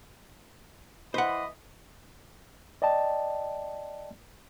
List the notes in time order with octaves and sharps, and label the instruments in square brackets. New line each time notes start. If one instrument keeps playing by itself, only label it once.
[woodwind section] E3 D#5 B5 [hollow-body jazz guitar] C5 F#5
[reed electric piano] D5 D#5 G5 A5